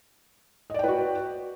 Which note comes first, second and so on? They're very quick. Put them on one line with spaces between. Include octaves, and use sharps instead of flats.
D#5 D5 G5 B4 F#4